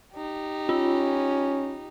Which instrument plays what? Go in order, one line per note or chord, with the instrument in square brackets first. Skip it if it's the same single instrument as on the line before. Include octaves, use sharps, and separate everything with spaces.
[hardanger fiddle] D#4 G4
[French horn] C#4 [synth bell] F4